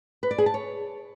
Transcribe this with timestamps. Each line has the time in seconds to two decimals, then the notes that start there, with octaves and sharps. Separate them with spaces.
0.23 B4
0.31 D5
0.38 G#4
0.46 A5
0.54 C#5